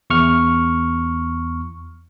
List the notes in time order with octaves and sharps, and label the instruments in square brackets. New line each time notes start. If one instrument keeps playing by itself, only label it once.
[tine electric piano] E2 C#6 F6